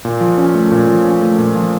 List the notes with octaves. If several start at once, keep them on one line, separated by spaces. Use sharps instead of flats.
A#2
F3
C#4
A3
A#2
F3
C#4
A3
A#2
F3